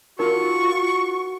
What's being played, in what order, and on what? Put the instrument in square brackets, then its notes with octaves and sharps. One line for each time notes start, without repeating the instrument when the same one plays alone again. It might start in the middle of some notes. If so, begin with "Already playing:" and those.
[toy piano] D#4 A#4 [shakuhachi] F4 [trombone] F#4 [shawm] C#6